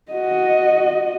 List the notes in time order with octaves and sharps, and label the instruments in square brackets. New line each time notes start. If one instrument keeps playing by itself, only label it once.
[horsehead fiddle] F#4 D#5